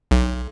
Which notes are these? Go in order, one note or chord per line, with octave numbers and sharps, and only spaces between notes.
B1